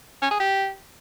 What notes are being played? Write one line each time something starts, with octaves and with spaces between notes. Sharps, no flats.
C#4
G#4
G4